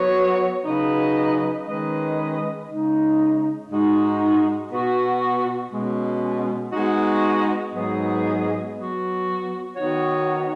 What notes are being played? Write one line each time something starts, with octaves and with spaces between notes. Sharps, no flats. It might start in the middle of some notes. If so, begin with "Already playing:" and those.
Already playing: F#3 B3 F#4 C#5
C#3 F#3 D#4 B4 D#5
D#3 G#3 C#4 B4 D#5
C#3 G#3 D#4
G#2 G#3 D#4 F#4
B2 B3 F#4
B2 G#3 C#4
G#3 B3 D#4 F#4
G#2 F#3 B3 G#4 D#5
F#3 B3 F#4
D#3 B3 D#4 F#4 C#5